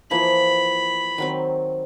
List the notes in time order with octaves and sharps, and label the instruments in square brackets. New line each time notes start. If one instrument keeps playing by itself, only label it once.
[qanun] E3 F3 A#3 [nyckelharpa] B5
[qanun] D#3 F#3 C4